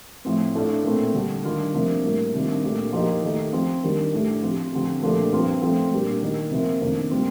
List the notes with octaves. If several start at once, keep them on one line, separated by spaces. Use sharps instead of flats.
A2 F3 C4
A2 A3 D4 F4
A#2 A3 C4
D3 G3 D4
D#3 G3 D4 F4
C3 F3 A#3 D4
A2 G3 A#3 F4
C3 D#3 G3 D4 F4
A#2 A3 D4 G4
F3 A#3 D#4 G4
D#3 A3 D#4 G4
F3 C4 F4
D#3 G3 D4 G4
A2 A3 D4 G4
F3 C4 G4
D3 F3 C4 G4
A#2 F3 A3 D4 G4
G2 F3 C4 F4
F3 A3 C4
A#2 G3 D4 G4
D#3 A#3 D#4 G4
C3 F3 A#3 F4
F2 C3 D#3 A#3 D4
A#2 G3 C4 F4